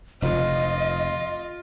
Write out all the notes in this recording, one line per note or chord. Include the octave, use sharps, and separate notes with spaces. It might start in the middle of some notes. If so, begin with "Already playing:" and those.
F1 D3 F4 D#5